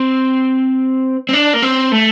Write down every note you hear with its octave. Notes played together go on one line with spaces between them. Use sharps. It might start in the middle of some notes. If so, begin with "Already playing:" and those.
Already playing: C4
C4
D4
A#3
C4
A3